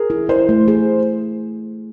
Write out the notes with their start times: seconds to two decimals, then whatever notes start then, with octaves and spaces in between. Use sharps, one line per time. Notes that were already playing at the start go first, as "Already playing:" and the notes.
Already playing: G#4 A#4
0.10 E4
0.29 E4 A#4 C5
0.49 A3
0.68 G#4